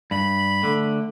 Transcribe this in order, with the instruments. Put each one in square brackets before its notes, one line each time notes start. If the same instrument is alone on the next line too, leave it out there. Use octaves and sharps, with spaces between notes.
[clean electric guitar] G2 [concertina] B5
[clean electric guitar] D3 [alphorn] A3